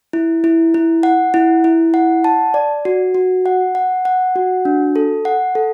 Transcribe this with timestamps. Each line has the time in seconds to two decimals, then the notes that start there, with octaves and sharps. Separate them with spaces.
0.13 E4
0.44 E4
0.74 E4
1.03 F#5
1.34 E4
1.64 E4
1.94 F#5
2.24 A5
2.54 D5
2.85 F#4
3.15 F#4
3.46 F#5
3.75 F#5
4.05 F#5
4.36 F#4
4.65 D4
4.96 A4
5.25 F#5
5.55 A4